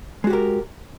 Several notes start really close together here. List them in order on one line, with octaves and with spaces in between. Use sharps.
G#3 F#4 G4 A#4